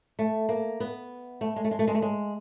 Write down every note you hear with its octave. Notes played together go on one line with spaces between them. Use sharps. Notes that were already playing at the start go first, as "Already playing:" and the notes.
A3
A#3
B3
A3
G#3
A3
G#3
A3
G#3
A3
G#3